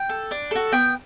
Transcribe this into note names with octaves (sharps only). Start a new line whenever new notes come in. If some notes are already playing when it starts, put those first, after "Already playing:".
Already playing: G5
A4
D4
F#4 A4
B3 G5